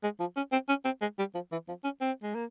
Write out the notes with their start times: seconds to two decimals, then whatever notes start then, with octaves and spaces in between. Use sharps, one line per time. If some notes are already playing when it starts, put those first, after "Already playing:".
0.03 G#3
0.20 F3
0.36 C#4
0.52 C4
0.69 C#4
0.85 C4
1.01 G#3
1.19 G3
1.34 F3
1.52 E3
1.68 F3
1.84 C#4
2.01 C4
2.23 G#3
2.35 A#3